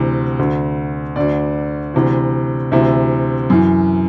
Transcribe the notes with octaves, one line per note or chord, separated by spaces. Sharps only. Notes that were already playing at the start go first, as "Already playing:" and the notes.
Already playing: D2 C3 E3
D2 D3
D2 D3 D5
D2 C3 E3
D2 C3 E3 E5
F#2 E3